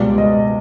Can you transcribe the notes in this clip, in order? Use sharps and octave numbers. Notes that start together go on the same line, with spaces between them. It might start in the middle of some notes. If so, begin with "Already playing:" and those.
Already playing: C#2 B2 G3 D5
D#5